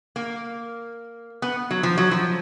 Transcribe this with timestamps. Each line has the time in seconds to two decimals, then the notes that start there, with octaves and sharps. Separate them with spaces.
0.16 A#3
1.42 B3
1.71 F#3
1.83 F3
1.97 F#3
2.11 F3